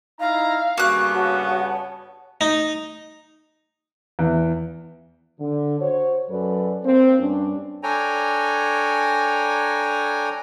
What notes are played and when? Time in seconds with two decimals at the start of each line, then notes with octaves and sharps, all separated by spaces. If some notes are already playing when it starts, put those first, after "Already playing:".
0.20 D#4 E4 F5 A#5
0.78 G2 C#3 A#3 B3 F#4 C#6 F#6
1.14 F#4 C#5 F#5 A5
2.41 D#4
4.19 E2
5.40 D3
5.80 F#4 C5 C#5
6.29 F#2 F#3 A4 B4 D5
6.84 A#3 C4
7.19 G2 C#4 D4
7.83 D4 A4 C#5 G5 G#5 A#5